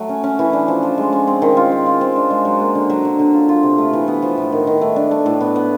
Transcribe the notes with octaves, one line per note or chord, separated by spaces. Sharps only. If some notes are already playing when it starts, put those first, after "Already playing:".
Already playing: F#3 A3
C#4
C#4
E3
D4
F3
F3
G#3
C#4
C4
D#3
F4
C4
F4
C4
D4
G#3
F#3
A#3
D3
F#3
D3
D3
F4
F4
C3
A3
E3
B3
F3
A2
D#3
D#3
A3
D4
A3
A2
B3
B3